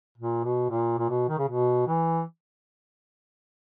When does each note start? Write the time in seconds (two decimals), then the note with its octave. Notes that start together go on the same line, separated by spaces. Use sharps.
0.18 A#2
0.44 B2
0.70 A#2
0.98 A#2
1.09 B2
1.29 D#3
1.38 C#3
1.48 B2
1.87 E3